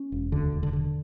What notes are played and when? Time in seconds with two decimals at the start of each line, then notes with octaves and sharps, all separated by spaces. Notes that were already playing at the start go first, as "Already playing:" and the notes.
Already playing: C#4
0.12 E1
0.32 D2 D3
0.53 E1
0.63 D3
0.73 D3